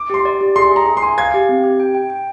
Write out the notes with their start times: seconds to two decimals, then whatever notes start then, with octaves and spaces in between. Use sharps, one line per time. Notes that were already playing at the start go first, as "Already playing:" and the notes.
Already playing: D6
0.10 G4 C6
0.25 D5
0.41 G4
0.56 G#4 C6
0.71 G#4 A#5
0.86 G#4
0.97 C6
1.02 G#5
1.18 F5 G#6
1.34 G4
1.49 C4
1.64 G4
1.80 G5
1.95 G5
2.10 G5